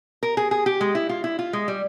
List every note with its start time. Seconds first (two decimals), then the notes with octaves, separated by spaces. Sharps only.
0.23 A#4
0.37 G#4
0.51 G#4
0.66 G4
0.81 G#3
0.95 E4
1.09 F4
1.24 E4
1.39 F4
1.53 G#3
1.68 G3